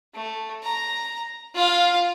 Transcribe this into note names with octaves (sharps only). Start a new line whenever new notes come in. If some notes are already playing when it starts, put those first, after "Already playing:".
A3
A#5
F4 F5